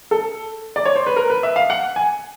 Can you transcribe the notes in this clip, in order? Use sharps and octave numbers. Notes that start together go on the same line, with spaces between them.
A4
D5
C#5
C5
B4
A#4
B4
E5
F5
F#5
G#5